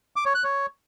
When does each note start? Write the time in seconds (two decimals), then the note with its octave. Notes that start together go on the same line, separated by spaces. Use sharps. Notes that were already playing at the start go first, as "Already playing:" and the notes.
0.16 D6
0.25 C#5
0.35 F#6
0.44 C#5